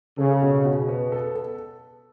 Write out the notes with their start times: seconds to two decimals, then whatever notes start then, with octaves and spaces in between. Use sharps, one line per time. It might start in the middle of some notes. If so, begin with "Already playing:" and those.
0.18 C#3 A4
0.42 B2
0.65 B2
0.88 B3
1.12 A4
1.35 A4